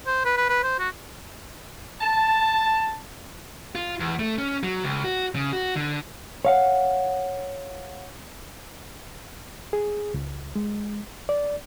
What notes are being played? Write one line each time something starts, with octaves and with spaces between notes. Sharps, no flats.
C5
B4
B4
B4
C5
F#4
A5
F4
E2
A3
C#4
F#3
C#2
F#4
C#3
F#4
D3
C#5 F5 F#5
G#4
C#2
G#3
D5